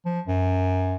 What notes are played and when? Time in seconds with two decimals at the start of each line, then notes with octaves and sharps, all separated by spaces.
0.05 F3
0.27 F#2